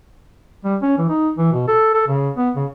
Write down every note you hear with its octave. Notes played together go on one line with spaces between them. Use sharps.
G3
C#4
E3
D#4
E3
B2
A4
A4
C#3
B3
C#3